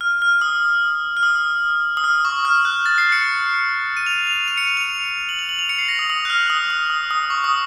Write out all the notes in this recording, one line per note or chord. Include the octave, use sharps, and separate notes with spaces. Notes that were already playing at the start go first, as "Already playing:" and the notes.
F6
F6
D#6
F6
D#6
D#6
F6
C#6
F6
F#6
A6
C7
C#7
D#7
F7
F7
D#7
C#7
D#7
F7
F#7
F7
F#7
F7
C#7
C7
A#6
D#6
D#6
F#6
F6
D#6
D#6
D#6
D#6
C#6
D#6